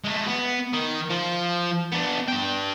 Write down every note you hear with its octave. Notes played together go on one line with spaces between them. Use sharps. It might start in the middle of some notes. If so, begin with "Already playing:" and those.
G#3 A3
B3
D#3
F3
B3 D4
D4 G5